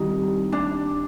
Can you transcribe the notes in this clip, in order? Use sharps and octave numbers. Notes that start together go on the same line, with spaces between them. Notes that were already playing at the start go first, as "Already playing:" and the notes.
Already playing: D#3 G3 C4 D#4 E4 G4
D4